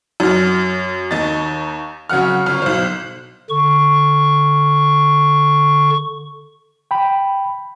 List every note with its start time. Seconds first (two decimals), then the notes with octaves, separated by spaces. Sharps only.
0.20 F#2 F6
1.11 D#2 D#4 A6
2.09 C#3 F#3 F#5 F6
2.46 G1 F6
2.62 B1 C5
3.50 D3 C#6
6.91 G5 B5